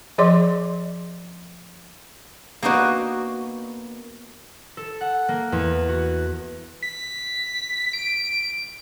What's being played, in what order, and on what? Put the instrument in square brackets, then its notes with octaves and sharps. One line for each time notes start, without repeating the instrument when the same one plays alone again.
[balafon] F3 G#4 D5 D#5 C6 D6
[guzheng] A#3 B3 D4 D#4 F#4
[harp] A4
F#5
A#3
E2
F#4
[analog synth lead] B6
D7